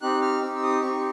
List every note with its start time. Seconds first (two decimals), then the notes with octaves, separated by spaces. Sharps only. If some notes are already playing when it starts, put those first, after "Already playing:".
0.02 C4 D#4 G4 F#6
0.22 F6
0.42 C4 D#4 G4 E6
0.55 E6
0.63 D#6
0.82 C4 D#4 G4 C#6